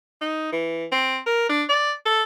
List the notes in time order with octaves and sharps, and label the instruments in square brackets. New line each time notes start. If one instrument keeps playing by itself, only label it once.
[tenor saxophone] D#4
E3
C4
A#4
D4
D5
A4